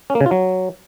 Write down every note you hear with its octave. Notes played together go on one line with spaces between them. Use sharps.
C#4
A#3
C#3
F4
F#3